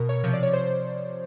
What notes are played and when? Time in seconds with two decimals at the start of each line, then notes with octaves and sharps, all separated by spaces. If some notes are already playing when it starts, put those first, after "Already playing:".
Already playing: B2 A#4
0.09 C#5
0.23 C3 F3 C#5
0.33 D5
0.43 C#5
0.53 C5